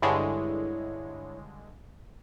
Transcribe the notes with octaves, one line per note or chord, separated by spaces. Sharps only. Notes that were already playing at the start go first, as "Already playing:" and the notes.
G2 D3 G#3 E4 C#5